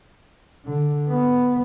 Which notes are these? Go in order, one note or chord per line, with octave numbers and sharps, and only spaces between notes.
D3
B3